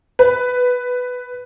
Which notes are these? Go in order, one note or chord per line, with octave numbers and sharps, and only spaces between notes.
B4